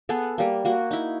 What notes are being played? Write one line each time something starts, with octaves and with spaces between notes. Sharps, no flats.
B3 G#4 A4
G3 A#3
A#3 F#4
D#4 E4